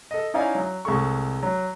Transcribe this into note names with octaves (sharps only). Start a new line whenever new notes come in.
A4 D#5
C#4 D#4 E4 D5 F5 G#5
F#3
C2 G#3 A4 C#6
F#3